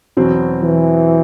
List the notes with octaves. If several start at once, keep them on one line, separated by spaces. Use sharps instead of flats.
E2 B2 F#3 C4
E3